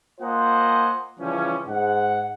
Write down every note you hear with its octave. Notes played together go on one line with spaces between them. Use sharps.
A#3 F4 C5 D#5 F#5 G#5
C#3 E3 F3 G3 C#4
G#2 F#5